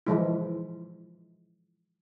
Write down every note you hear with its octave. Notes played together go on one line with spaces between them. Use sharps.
E3 F3 G#3 E4